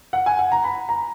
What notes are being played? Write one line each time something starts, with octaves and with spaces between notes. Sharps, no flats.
F#5
G#5
F#5
A#5
B5
A#5